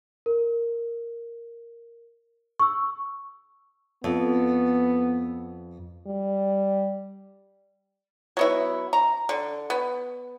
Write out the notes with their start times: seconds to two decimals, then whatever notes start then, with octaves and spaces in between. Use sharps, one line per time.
0.26 A#4
2.60 C#6 E6
4.04 F2 B3
6.07 G3
8.37 F#3 B3 E4
8.93 A#5
9.29 D3
9.70 B3